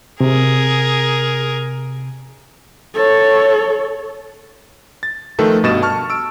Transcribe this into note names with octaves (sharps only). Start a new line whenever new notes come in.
C3 G#4 A#4
A4 C#5
A6
D#3 F3 A3 A4 B4
G2 B2 D#5 C#6 A6 E7
A5 C#6 F6
E6 D7